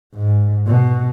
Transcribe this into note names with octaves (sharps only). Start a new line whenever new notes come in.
G#2
B2